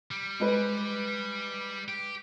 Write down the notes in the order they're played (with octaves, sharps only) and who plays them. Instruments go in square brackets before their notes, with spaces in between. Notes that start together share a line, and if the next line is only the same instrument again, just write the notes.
[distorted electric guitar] G3
[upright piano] G#3 B4
[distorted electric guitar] G4